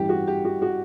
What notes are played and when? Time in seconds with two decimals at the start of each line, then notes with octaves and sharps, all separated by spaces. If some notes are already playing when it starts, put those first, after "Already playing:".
Already playing: A1 G2 E3 G4
0.09 F#4
0.27 G4
0.45 F#4
0.62 F#4